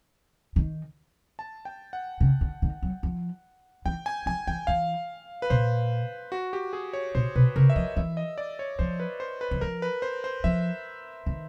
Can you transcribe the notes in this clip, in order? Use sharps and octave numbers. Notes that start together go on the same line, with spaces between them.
D#3
A5
G5
F#5
C#3
D3
D#3
F#3
F3
E3 G5
G#5
F3 G#5
E3 G5
E3 F5
B4
A#2 C5
F#4
G4
G#4
C#5
A#2 C5
B2 B4
C#3 A#4
E5
F3 D#5
E3 E5
D#5
D5
C#5
F3 C5
B4
C5
B4
E3
F3 A#4
B4
C5
C5
F3 E5
D#3